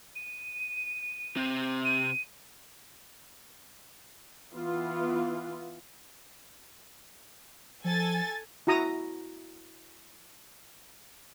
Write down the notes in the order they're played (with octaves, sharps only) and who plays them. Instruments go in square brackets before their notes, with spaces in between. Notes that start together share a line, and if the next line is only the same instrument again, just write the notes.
[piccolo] D#7
[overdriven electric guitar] C3 C4
[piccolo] D#7
[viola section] E3 B3 F4
[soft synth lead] F3 [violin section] A4 G#5 A6
[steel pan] E4 F#4 A#5 D#6